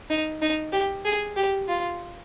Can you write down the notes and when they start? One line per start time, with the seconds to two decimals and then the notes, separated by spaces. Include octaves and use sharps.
0.10 D#4
0.42 D#4
0.73 G4
1.05 G#4
1.36 G4
1.68 F4